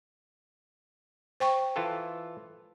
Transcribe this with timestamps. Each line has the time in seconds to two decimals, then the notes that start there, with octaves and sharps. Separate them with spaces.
1.40 C5 G5 C#6
1.76 E3 F4 A4